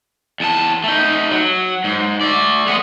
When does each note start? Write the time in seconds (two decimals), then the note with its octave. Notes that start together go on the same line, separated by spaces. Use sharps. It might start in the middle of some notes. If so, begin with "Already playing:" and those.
0.40 E2 A5
0.84 A3 D#4
1.31 F#3
1.84 G#2
2.21 A3 D5
2.67 G#3 B3